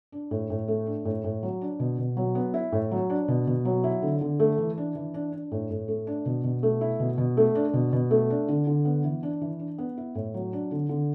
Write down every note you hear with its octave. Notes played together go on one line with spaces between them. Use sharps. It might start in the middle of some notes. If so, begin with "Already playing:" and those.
D4
A2
A2
A3
D4
A2
A2
F#3
D4
B2
B2
F#3
B3
E4
A2
F#3
D4
B2
B2
F#3
E4
D3
D3
A3
E3
D4
E3
D4
D4
A2
A2
A3
D4
B2
B2
A3
E4
B2
B2
A3
D4
B2
B2
A3
D4
D3
D3
B3
E3
D4
E3
D4
B3
E4
A2
F#3
D4
D3
D3